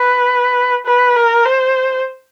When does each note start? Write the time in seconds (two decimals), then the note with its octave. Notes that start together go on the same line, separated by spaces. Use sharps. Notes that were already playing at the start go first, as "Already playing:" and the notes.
Already playing: B4
0.86 B4
1.16 A#4
1.45 C5